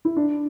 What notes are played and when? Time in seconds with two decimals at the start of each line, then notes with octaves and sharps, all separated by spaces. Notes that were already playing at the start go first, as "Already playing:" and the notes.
0.05 E4
0.17 D4